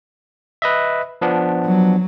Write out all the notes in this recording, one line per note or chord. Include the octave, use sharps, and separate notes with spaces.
B4 D#5 E5
F3 B3 D4
F#3